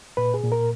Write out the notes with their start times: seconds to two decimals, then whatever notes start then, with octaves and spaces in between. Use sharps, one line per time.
0.17 A#2 B4
0.34 G#4
0.43 A#2
0.52 A#4